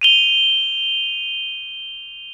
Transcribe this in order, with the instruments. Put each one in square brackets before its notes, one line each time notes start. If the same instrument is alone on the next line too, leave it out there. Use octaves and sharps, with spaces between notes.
[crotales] D#7 F7 G7